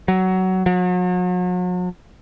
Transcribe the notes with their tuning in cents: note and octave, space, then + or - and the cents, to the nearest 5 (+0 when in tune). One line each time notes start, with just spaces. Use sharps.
F#3 +15
F#3 -40